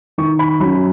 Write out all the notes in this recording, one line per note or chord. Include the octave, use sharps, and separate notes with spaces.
D#3 C#6
B5
F#3 C#4 B5